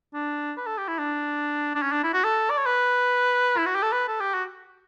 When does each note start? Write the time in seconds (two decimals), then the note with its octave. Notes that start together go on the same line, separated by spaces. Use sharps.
0.14 D4
0.57 B4
0.66 A4
0.78 G4
0.88 E4
0.98 D4
1.75 D4
1.82 C#4
1.92 D4
2.04 E4
2.14 F#4
2.24 A4
2.50 D5
2.58 C#5
2.66 B4
3.58 E4
3.66 F#4
3.75 G4
3.83 A4
3.92 B4
4.08 A4
4.20 G4
4.34 F#4